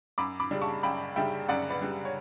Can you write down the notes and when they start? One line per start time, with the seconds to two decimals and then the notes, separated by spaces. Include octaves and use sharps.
0.18 F#2 B5 D6
0.40 B5 D6
0.51 C#3 G3 D4
0.61 A5 C#6
0.83 F#2 G5 B5
1.16 C#3 G3 D4 E5 G5
1.48 F#2 D5 F#5
1.70 B4 D5
1.81 C#3 G3 D4
2.05 C#5